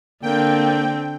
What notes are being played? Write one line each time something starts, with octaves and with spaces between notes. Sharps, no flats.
D3 A#3 C4 G5